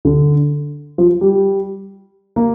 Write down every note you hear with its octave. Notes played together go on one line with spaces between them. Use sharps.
D3
F3
G3
A#3